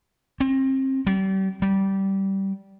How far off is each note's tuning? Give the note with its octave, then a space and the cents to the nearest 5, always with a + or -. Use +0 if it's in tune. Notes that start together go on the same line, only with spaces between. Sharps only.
C4 +30
G3 -35
G3 -15